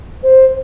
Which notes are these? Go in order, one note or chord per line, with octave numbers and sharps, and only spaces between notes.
C5